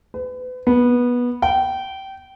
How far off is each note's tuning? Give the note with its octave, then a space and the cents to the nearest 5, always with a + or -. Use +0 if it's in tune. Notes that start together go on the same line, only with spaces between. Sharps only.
B4 +35
B3 -15
G5 -20